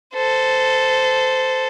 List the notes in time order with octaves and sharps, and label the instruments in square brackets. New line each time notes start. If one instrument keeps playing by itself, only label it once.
[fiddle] A4 C5